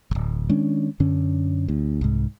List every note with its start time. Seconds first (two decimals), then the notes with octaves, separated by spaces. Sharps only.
0.11 D1 G1
0.49 D#3 G#3 C#4 D4
1.00 F#2 D3 C#4
1.68 D2
2.01 C2 G#2